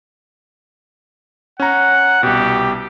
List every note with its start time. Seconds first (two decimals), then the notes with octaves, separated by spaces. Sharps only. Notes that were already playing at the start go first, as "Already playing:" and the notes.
1.60 C#4 F#5 A#5
2.23 C2 B2 G4